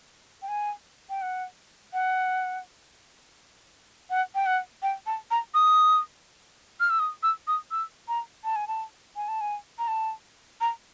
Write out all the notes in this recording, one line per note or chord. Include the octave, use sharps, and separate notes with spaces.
G5
G#5
G5
F#5
F#5
F#5
G5
F#5
G5
A5
A#5
D#6
F6
E6
D#6
E6
D#6
E6
A#5
A5
G#5
A5
G#5
A5
G#5
A#5
A5
A#5